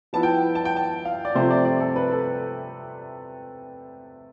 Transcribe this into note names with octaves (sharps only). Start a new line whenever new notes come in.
F3 B3 E4 A5
G5
A5
G5
A5
F5
D5
C3 F3 A3 C4 C5
D5
D5
A4
B4
A4